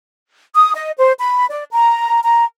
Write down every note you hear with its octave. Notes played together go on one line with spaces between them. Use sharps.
D#6
D#5
C5
B5
D5
A#5
A#5